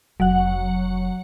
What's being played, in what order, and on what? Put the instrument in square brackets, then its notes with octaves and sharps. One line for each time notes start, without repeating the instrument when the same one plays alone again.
[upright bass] F1 [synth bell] F#3 F#5